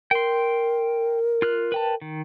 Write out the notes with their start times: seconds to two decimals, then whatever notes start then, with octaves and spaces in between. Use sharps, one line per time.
0.11 A#4 G5 C6
1.42 F4 F6 F#6
1.72 B4 G5 A5
2.02 D#3